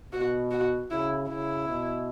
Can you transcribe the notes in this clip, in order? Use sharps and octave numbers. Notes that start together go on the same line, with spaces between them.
B2 F#4
F#4
C#3 E4
C#3 E4
B2